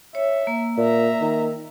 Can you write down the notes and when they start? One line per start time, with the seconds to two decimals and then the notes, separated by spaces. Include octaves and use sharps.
0.15 C#5 E5
0.47 A#3
0.78 A#2 E5 A#5
1.21 D#3